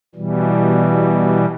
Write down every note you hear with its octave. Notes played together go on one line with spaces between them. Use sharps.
B2 E3 G3